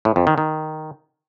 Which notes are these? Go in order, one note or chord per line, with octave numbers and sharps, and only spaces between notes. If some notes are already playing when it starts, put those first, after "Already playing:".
A2
F2
D#3
D#3